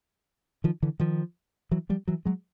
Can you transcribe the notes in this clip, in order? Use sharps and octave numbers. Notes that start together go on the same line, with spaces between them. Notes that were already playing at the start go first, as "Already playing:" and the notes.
D#3 F3
D3 E3
D#3 F3
E3 F#3
F3 G3
E3 F#3
F#3 G#3